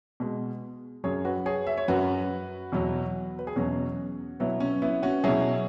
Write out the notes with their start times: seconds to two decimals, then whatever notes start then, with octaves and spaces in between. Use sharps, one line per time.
0.20 B2 G#3
1.04 F#2 F#3 G#4 C#5
1.25 F#4 B4
1.46 G#4 C#5
1.67 E5
1.77 C#5
1.88 F#2 F#3 F#4 B4
2.72 E2 B2 F#3
3.39 B4
3.47 G#4
3.56 E2 B2 F#3 C#4 F#4
4.40 B2 F#3 B3 E4
4.60 C#4
4.82 B3 E4
5.03 C#4 F#4
5.24 B2 F#3 E4 G#4